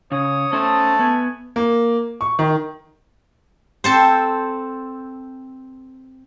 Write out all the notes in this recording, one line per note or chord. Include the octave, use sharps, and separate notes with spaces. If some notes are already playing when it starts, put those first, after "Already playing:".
C#3 C#5 D#6
A3 C#4 C5 A5
B3 G#5
A#3
C#6
D#3
C4 A4 C5